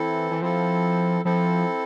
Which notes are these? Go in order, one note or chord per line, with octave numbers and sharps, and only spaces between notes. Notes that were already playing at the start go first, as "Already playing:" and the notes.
Already playing: E3 C4 E4 A4
E3
F3 C4 E4 A4
F3 C4 E4 A4